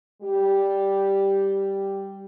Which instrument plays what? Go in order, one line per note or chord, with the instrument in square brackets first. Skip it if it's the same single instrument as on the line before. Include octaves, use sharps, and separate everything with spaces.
[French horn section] G3 G4